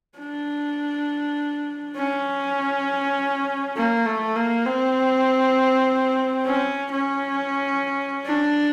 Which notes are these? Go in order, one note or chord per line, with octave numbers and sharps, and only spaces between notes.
D4
C#4
A#3
A3
A#3
C4
C#4
C#4
D4